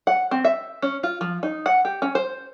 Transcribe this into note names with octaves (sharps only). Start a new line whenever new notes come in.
F#5
C4
E5
C#4
F4
F3
D#4
F#5
G4
C#4
C5